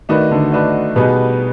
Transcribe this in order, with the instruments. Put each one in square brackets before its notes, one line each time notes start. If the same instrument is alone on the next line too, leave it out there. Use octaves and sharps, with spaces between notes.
[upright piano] D#3 [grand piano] A3 D4 F#4 B4 D#5
[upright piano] D3
[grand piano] A3 D4 F#4 B4 D#5
[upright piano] B2 [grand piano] G3 B3 D#4 G#4 B4